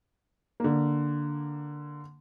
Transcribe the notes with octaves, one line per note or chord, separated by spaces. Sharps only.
D3 A#3